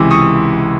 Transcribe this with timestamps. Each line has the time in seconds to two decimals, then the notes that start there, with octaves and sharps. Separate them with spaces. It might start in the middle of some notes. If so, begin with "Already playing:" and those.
Already playing: C#2 C3 E3 G#3 C6 D6
0.11 C#6 D#6